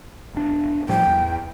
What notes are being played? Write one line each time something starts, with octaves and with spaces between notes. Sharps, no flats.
E1 D4
A2 F3 G3 G5
E2